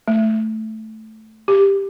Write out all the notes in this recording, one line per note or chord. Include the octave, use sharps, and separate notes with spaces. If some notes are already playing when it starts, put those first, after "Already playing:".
A3
G4